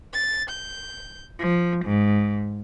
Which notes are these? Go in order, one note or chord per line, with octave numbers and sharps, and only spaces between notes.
A6
G6
F3
G#2